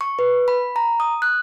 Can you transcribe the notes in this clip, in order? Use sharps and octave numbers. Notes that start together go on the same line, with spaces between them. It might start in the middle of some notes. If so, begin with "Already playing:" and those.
C#6
B4
B5
A#5
D#6
F#6